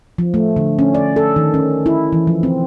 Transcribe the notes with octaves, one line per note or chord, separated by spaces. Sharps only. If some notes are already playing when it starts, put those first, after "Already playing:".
F3
A3
D3
C#4
D5
A4
D#3
C#4
E4
E3
F3
C4